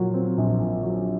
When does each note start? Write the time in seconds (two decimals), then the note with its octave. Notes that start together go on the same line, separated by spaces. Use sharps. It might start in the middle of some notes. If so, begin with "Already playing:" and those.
Already playing: A#2 F#3
0.14 C4
0.38 A#1
0.61 A#2
0.83 F#3